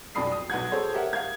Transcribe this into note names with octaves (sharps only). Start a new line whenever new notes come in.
B1 F2 D5 B5 D#6 C7
D#6
B1 B4 F#5 G#6
G#4 A4 C5 C#5
G4 A#4 E5 F#5
F5 G#6